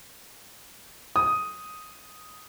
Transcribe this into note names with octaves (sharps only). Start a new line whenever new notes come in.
D#6